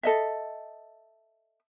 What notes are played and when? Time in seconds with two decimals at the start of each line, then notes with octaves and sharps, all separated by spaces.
0.03 A4 D#5 E5